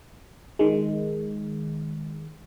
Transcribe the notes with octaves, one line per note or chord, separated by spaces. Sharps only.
D#3 G#3